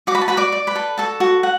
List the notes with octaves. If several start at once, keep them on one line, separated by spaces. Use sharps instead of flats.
F#4 D6
B5
A5
F#4 B4 B5
D5 D6
D5
B4 B5
A4
F#4 A4 A5
F#4
F#5